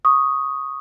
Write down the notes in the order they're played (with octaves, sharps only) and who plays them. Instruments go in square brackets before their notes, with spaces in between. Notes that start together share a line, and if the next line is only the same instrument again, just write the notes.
[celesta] C#6 D#6